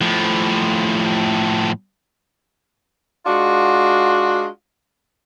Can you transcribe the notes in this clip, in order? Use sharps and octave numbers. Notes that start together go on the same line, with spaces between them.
A2 F3
G#3 D4 F4 F#4